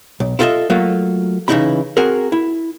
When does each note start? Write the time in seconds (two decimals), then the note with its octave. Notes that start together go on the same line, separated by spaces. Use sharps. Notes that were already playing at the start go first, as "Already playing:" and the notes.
0.20 B1
0.39 E4 F4 A4 C5 D#5 E5
0.70 F#3 A3 A#3 F4
1.48 C#3 E3 F3 D#4 E4 B5
1.97 C4 F#4 G#4 A#4
2.32 E4